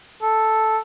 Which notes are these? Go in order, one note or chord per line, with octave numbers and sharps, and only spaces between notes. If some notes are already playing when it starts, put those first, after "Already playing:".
A4